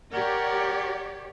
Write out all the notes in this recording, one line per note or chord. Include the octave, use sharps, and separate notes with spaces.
G4 A#4 C#5 D5 F#5